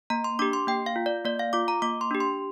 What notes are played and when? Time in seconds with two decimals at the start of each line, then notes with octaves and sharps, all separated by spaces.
0.10 A#3 A#5
0.24 C6
0.39 D4 G4 D6
0.53 C6
0.67 A#3 G5
0.86 F5
0.96 F4
1.06 D5
1.25 A#3 D5
1.39 F5
1.53 F4 D6
1.68 A#5
1.82 A#3 D6
2.01 C6
2.11 D4 G4
2.20 C6